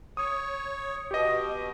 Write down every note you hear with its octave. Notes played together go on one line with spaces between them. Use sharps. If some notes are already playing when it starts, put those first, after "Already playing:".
C#5 D#6
B2 G4 D#5